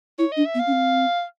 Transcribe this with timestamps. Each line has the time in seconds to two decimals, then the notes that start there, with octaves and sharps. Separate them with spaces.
0.18 E4 C#5
0.32 D4 D#5
0.46 E5
0.55 B3
0.59 F5
0.67 C#4
0.72 C4